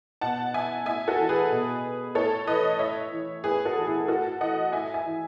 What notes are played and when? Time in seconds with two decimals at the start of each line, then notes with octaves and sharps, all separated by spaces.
0.21 B2 F#5 A5
0.54 E5 G#5
0.86 A2 E5 G#5
1.08 F#4 A4
1.19 E3
1.29 G#4 B4
1.51 B2
2.15 A2 A4 C#5
2.47 E3 B4 D#5
2.79 A2 C#5 E5
3.12 E3
3.44 A2 G#4 B4
3.65 F#4 A4
3.76 E3
3.87 E4 G#4
4.08 A2 F#4 A4
4.41 E3 D#5 F#5
4.73 A2 E5 G#5
4.94 E5 G#5
5.05 E3